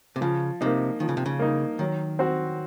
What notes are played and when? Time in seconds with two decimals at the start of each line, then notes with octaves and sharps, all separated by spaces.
0.16 C3
0.21 C#3 F3
0.61 C3 A#3 D#4
1.00 D#3 F3
1.09 C#3
1.17 C3
1.26 C#3
1.39 A#3 D#4
1.79 D#3 F#3
2.19 C4 F#4